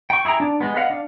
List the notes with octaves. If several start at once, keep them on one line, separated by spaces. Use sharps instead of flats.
G5 C#6
E4 G#4 G5 A#5
D4
G#3 B3
B4 D#5 F5 F#5
D4 F5